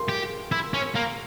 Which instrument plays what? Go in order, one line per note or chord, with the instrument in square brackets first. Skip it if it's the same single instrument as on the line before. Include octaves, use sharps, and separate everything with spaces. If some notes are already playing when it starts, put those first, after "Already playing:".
Already playing: [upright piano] C6
[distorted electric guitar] G4
E4
C#4
A#3